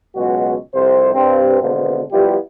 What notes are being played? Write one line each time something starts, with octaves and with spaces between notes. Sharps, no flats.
C#2 B2 F#3 G#3 F#4
C2 F2 C3 C5
G2 C4
G#1 B2 D3 A#3 B3 C5
F3 G3 B3 E4 F4 G4